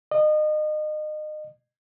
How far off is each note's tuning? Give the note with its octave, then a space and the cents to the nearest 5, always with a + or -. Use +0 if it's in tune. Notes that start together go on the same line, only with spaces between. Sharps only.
D#5 -30